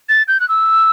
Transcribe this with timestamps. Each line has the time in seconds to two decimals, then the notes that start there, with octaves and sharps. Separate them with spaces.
0.09 A6
0.28 G6
0.40 F#6
0.49 E6